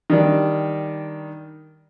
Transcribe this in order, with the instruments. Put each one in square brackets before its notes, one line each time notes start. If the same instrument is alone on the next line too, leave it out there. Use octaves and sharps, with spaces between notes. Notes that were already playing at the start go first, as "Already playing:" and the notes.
[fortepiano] D#3 G3 D4 D5